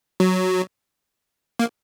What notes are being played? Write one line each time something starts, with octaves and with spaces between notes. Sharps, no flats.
F#3
A#3